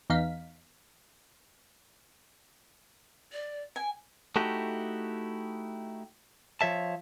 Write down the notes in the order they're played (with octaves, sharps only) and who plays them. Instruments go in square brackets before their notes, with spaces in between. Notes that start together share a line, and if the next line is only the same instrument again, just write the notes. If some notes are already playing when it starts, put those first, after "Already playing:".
[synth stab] E2 D#4 F5 B6
[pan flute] D5
[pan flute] G5 [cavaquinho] G#5
[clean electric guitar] A3 D#4 E4 F#4 G4
F3 C#5 E5 A5